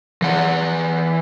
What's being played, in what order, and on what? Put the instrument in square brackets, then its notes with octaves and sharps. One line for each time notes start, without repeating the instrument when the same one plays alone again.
[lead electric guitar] E3 F#5